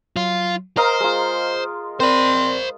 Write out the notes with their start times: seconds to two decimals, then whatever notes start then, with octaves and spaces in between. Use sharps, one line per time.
0.16 F#3 F4
0.77 A#4 C5 D#5 F5 A#5 F6
1.00 G#3 F4
2.00 C4 A#4 C5 D5 B5